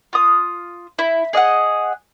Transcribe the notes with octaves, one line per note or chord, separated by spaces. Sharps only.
F4 D#6
E4
G#4 D#5 F5 F#5